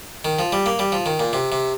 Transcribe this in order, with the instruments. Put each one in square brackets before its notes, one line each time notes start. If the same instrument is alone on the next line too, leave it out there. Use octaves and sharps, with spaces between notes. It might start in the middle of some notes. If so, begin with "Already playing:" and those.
[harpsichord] D#3
F3
G3
A#3
G3
F3
D#3
A#2
C3
C3